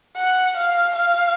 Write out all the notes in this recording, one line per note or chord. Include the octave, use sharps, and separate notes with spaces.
F#5
F5
F5